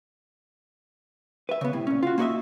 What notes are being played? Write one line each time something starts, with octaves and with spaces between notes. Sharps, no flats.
B4 E5
C#3 B3
A2 C3
A#2 C#4
F4 F#4
A#3 D#4 F#4 C#5 D#5 E5